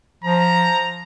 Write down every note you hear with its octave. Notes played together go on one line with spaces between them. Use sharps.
F3 A#5